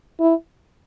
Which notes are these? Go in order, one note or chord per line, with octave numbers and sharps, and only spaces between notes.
E4